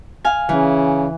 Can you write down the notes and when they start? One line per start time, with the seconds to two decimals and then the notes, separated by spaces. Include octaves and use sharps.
0.25 F5 G#5
0.49 C#3 E3